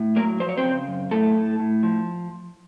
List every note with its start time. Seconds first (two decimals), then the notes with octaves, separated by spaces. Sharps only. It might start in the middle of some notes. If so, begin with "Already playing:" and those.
Already playing: A2
0.16 F#3 A#3 A#4
0.40 F3 C5
0.49 C#5
0.58 C4 C5
0.64 C#3
0.88 F#2
1.11 A2 A3 A4
1.35 A2
1.60 A2
1.83 F3